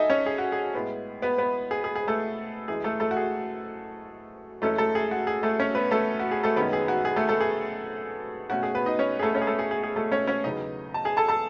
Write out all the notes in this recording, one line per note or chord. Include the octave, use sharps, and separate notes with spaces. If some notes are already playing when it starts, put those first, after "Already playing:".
Already playing: D#4 A4 D#5 E5 G#5
C#4 C#5
G#4
F#4
G#4
A2 G#3 B3
B3 B4
B3 B4
G#4
G#4
G#4
A3 A4
F#2 E3 G#3 G#4
A3 A4
A3 A4
F#4
G#4
F#2 E3 G#3 A3 C#4 A4
A3 A4
G#4
F#4
G#4
A3 A4
C#4 C#5
B3 B4
A3 A4
F#4
G#4
A3 A4
F#2 D#3 G#3 B3 C#4 B4
G#4
F#4
G#4
A3 A4
A3 A4
G#4
B2 A3 C#4 F#4
G#4
B3 B4
D#4 D#5
C#4 C#5
G#4
A3 A4
C#4 C#5
G#4
A3 A4
G#4
G#4
G#4
A3 A4
C#4 C#5
C#4 C#5
E2 C#3 F#3 B3 D#4 D#5
A5
G#4 G#5
A4 A5
A4 A5